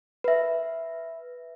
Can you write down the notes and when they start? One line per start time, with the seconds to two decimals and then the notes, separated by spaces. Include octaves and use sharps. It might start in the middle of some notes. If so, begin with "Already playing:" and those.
0.24 B4 E5